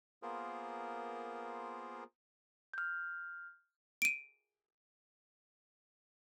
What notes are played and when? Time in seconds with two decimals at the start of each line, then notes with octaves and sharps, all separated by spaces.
0.22 A#3 B3 F4 G#4 A#4 C5
2.74 F6 G6
4.02 D7 D#7